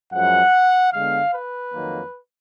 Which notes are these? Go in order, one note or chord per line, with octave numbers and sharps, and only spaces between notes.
F#2 F3 G#3 F#5
D3 G#3 B3 F5
B4
F2 D#3 F#3 A#3